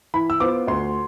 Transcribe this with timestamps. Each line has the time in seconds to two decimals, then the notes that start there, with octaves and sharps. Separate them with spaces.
0.14 E3 B5
0.30 E6
0.40 B3 F4 C5 D6
0.67 D2 C6